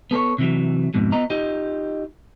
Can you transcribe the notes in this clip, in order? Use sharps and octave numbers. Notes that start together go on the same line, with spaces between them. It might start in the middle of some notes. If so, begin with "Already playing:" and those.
B3 A4 C5 C#5
C3 E3 F#3
F2 G#2 B2
B3 F4 D#5 A#5
D#4 F4 G4 D#5